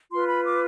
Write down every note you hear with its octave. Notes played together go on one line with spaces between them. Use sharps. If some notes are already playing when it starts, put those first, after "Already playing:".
F4 B4 C6
B5
D6